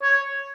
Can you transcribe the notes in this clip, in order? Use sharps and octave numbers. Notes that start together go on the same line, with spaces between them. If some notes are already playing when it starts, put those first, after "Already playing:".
C#5